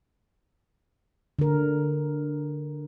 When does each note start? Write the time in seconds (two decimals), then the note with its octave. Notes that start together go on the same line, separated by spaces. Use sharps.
1.39 D3 A#4